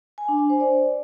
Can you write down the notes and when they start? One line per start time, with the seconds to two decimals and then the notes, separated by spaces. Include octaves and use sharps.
0.18 G#5
0.28 D4
0.39 G#5
0.50 C5
0.60 D5